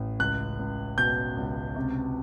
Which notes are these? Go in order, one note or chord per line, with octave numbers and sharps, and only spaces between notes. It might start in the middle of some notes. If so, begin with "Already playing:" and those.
Already playing: A1
C#2 F#6
C#2
B2 G6
C#2
C3